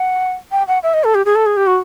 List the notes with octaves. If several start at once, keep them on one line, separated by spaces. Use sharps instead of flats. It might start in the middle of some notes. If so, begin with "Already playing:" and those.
Already playing: F#5
G5
F#5
E5
D#5
A4
G4
G#4
A4
G#4
G4
F#4